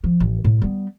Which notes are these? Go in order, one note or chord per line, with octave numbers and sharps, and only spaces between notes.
F3
A1
A2
G3 B3